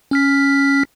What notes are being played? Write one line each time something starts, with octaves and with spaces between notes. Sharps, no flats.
C#4 F6 B6